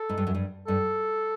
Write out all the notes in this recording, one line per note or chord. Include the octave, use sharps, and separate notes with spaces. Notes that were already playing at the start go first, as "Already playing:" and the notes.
Already playing: A4
G#2
G2
F#2
G2
G2 A4